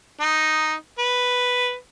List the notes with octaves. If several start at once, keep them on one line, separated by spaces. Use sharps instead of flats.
D#4
B4